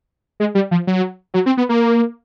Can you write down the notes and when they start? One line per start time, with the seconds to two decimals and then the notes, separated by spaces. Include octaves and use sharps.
0.40 G#3
0.55 G3
0.71 F3
0.87 F#3
1.34 F#3
1.46 C4
1.57 B3
1.69 A#3